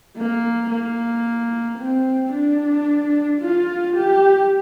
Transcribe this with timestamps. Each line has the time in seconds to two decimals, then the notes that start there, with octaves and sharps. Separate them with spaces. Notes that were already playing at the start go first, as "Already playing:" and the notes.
0.17 A#3
0.70 A#3
1.78 C4
2.33 D4
3.41 F4
3.96 G4